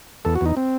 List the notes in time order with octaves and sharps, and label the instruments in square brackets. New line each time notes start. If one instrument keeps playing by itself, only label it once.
[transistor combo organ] E2 A4
F#4
E2 D#4
C4